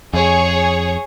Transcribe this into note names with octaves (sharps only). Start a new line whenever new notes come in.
F2 G#4 C#5